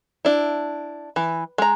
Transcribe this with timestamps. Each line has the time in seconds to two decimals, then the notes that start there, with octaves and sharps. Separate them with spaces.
0.25 D4 E4
1.16 E3
1.58 G#3 A#5